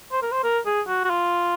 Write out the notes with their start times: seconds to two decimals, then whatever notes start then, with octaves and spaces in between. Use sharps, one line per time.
0.12 C5
0.22 A#4
0.32 C5
0.44 A#4
0.66 G#4
0.87 F#4
1.04 F#4
1.10 F4